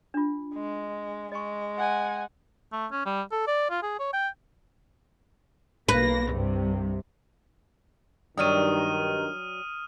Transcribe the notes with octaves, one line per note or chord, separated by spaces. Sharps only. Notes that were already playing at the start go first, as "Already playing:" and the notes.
D4 F4
G#3
G#3 D#5 C#6
F#5 G#5
A3
C#4
G3
A4
D5
F4
G#4
C#5
G5
B1 A#3 B4 A#6
C2 G2 C3
G2 D#3 F#3 D5 G5 D#6 F6 D#7